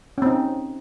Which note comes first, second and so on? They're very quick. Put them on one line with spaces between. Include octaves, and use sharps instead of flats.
C#4 C4 D#4